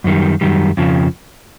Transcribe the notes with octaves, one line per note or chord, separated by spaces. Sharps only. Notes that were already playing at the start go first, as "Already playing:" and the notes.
F#2 D#3 G3
F#2 D#3 G3
F2 C#3 F3